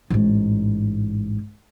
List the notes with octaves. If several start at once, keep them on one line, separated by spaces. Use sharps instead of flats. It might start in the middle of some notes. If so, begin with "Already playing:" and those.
A1 G#2